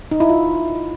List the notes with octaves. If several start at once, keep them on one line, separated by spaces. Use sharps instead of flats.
D#4
E4
F4